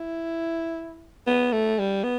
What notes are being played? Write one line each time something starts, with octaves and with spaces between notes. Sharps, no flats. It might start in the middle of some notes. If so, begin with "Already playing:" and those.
Already playing: E4
B3
A3
G3
B3